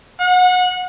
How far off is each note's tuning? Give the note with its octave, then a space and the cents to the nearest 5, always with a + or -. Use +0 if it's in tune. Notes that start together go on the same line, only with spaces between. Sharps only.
F#5 -25